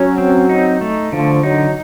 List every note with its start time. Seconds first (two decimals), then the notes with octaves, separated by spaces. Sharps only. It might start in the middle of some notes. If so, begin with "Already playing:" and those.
Already playing: F#3 C#4
0.18 C4
0.49 D#4
0.81 A3
1.12 D3 F3
1.43 F#3 D#4